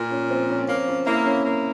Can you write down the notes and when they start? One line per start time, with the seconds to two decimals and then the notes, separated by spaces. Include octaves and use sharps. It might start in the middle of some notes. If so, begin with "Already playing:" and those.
Already playing: A#2
0.11 C#4
0.30 F3 C4
0.50 C#4
0.68 A#3 C#4
0.88 C#4
1.06 A#3 E4
1.26 C#4
1.45 A#3